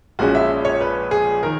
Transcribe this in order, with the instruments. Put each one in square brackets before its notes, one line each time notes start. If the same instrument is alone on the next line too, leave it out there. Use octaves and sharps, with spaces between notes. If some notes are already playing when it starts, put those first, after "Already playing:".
[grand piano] A#1 A#2 G#3 C#4 [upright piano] F#4
[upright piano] E5
C#5
B4
G#4
[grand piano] D#3 [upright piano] A#4